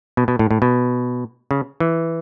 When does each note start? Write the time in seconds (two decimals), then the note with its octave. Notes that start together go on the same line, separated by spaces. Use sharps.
0.17 B2
0.28 B2
0.39 A2
0.51 A2
0.62 B2
1.51 C#3
1.80 E3